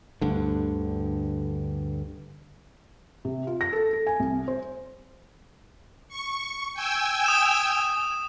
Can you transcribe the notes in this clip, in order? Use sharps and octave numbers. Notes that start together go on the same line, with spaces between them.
D2 G2 D3
C3
F4
A#6
A4
A4
G#5
C2
C5
C#6
G5 G#5 E6
D#6 E7